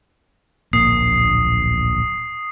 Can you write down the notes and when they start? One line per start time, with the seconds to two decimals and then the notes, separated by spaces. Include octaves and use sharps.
0.73 D1 A#1 A#3 D#6 C7